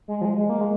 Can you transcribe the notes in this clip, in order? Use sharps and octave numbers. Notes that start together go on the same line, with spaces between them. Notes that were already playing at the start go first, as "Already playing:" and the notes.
G#3
F3
G#3
G#3
A#3
G#3